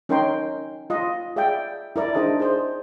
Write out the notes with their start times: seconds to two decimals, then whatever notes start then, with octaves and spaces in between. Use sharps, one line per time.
0.09 C#4 D#4 A#4 C#5 G5 C6
0.90 F4 D#5
1.36 G#4 D5 E5 F5 G5
1.96 E4 A#4 D5
2.14 D4 D#4 G#4 C5 D#5 A5
2.40 G#4 C5 D5